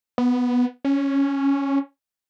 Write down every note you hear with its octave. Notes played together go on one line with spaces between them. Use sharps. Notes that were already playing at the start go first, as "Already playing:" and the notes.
B3
C#4